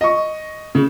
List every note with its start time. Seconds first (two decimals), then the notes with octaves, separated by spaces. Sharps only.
0.01 D#5 C#6
0.75 C#3